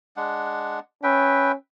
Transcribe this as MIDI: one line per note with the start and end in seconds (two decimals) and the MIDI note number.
0.17 0.80 56
0.17 0.80 62
0.17 0.80 78
1.03 1.55 61
1.03 1.52 71
1.03 1.52 76
1.03 1.52 79